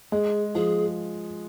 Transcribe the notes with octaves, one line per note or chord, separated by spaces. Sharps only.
G#3 G#4
F3 G#4